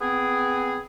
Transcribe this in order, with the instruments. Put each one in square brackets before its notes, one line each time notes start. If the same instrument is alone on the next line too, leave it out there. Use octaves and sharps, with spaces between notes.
[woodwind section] B3 C4 G#4